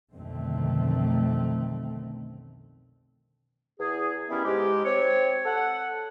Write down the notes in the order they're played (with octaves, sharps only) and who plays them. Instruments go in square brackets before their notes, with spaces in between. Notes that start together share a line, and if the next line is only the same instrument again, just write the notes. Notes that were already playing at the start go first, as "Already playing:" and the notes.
[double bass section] B1 F2 D3 D#3 A3 C4
[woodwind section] E2 G#4
D#3 E3 G3 B3 C#4 E4
G#2 G#3 G4
C4 C#5
A4 F#5